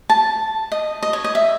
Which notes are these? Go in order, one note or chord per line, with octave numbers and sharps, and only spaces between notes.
A5
D#5
D#5
C#5
D#5
E5